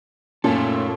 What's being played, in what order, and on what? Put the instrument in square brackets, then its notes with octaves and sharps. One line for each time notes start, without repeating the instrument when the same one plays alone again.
[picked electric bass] F#2 C#4 [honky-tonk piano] A#2 [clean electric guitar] A3 F4 A4